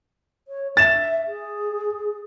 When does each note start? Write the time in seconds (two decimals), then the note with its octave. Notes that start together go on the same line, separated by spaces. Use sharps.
0.48 C#5
0.77 E5 A6 E7
1.27 G#4